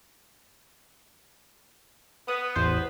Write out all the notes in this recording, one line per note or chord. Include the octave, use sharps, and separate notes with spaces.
B3 B4 D#6
A1 E2 C5